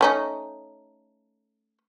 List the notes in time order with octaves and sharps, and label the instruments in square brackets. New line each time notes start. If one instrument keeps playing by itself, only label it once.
[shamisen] A3 C#4 D#4